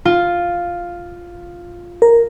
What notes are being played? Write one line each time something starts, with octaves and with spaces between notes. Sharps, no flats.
F4
A#4